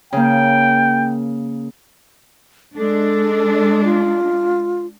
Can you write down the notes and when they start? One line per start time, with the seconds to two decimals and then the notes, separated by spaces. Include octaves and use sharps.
0.13 C#3 A#3 G5
2.77 G#3 D4 A4
3.84 F4